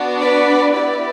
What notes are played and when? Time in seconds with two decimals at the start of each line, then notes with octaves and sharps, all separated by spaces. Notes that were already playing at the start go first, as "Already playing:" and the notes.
Already playing: B3 D4 F#4
0.19 B4 D5
0.72 B3 E4 G4 B4 D5